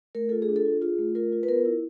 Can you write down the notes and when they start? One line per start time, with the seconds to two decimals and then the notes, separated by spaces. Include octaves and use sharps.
0.15 A3 A#4
0.29 F4 A4
0.42 G#4
0.49 D4
0.56 A4
0.65 F4
0.82 F4 G#4
0.98 A3
1.15 F4 A#4
1.32 F4
1.43 B4
1.49 B3 A#4
1.65 E4